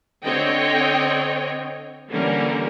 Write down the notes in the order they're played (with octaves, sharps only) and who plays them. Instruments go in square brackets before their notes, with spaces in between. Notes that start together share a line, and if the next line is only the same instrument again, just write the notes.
[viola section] D3 C4 C#5 D#5 G5
D3 E3 G3 A#3 C#4 A#4